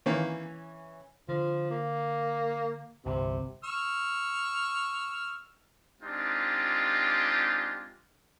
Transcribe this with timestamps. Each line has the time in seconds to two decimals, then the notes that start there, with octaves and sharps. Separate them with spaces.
0.06 D#3 E3 A#3 C#4 D#4
1.29 D3 F3
1.71 A#3
3.06 G1 C2 C3
3.64 C#6 E6 F6
6.01 G#3 C4 D4 D#4 F4 G4